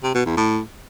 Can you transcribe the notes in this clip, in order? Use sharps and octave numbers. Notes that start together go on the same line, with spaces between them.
C3
B2
E2
A2